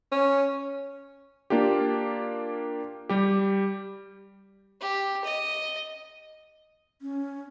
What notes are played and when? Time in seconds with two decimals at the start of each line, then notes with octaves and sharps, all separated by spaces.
0.12 C#4
1.50 A#3 D4 F4 G4
3.09 G3 G4
4.81 G4
5.24 D#5
7.01 C#4